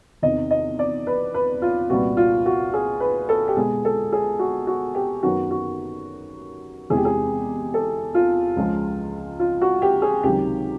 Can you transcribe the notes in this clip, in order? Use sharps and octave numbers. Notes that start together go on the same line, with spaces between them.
E2 C3 D#3 D#5
D#5
D5
B4
B4
F4
C2 A#2 G3 B3 F#4
F4
F#4
G#4
B4
A4
G4
B2 G#3 B3 G#4
A4
G#4
F#4
F#4
G4
F#2 D#3 F#3 B3 F#4
F#4
E2 C3 E3 G#3 G#4
G4
G#4
A4
F4
C#2 C#3 F3 G#3
F4
F#4
G4
G#4
C#2 C3 D#3 F#3 G4